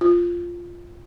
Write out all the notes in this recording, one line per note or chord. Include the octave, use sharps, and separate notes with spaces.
F4